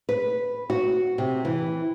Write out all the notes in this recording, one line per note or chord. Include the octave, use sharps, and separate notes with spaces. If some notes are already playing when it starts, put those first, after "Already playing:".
B4
F#4
C3
E3